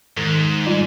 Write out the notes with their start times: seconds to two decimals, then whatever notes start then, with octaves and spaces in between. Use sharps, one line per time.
0.17 G#2 D#3
0.66 G3 F4